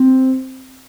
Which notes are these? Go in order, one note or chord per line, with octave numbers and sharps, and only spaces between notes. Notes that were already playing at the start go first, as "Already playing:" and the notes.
Already playing: C4